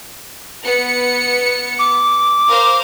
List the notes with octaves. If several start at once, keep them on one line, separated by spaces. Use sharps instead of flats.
B3 C#7
D6
A#4 C5 F5